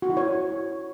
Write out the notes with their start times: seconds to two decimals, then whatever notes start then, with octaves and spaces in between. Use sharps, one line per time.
0.02 F#4
0.10 E4
0.17 C#5